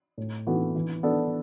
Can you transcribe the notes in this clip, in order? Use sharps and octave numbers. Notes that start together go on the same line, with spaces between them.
A2
E3 B3 F#4 A4
E3
B3 D4 A4